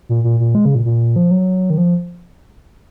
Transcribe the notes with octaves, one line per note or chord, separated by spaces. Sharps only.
A#2
A#2
A#2
G#3
C#3
A#2
A#2
F3
F#3
D#3
F3